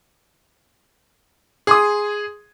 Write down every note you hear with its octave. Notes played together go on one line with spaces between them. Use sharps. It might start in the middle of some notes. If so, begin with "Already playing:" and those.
G#4 C6 D#6